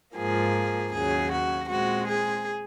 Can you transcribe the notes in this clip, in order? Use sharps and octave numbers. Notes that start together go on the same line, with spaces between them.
G#2 F3 A#3 G#4
D#2 C#3 F#3 G#4
F#4
A#2 G#3 C4 F#4
G#4